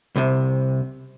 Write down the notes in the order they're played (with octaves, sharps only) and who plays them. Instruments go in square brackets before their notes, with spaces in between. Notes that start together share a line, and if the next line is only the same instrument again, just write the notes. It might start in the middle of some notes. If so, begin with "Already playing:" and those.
[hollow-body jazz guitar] C2 C3